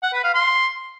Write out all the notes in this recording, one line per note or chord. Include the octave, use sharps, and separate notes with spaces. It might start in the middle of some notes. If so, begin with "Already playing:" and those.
F#5
B4
F5
C6